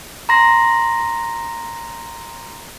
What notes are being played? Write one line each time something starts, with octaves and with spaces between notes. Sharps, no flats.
A#5 C6 A#6